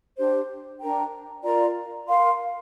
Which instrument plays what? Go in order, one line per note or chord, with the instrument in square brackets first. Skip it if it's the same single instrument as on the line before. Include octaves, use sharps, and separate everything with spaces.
[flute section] D4 G4 C5
D4 A#4 G5 A#5
F4 A#4 D5 A#5
A#4 F5 C6